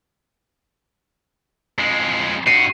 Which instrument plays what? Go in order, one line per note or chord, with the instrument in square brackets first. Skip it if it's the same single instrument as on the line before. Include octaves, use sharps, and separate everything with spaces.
[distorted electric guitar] F2 G#3
[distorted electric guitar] G2 F#4 [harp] C7 D#7